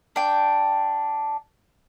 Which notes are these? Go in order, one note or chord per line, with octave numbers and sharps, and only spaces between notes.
D4 G5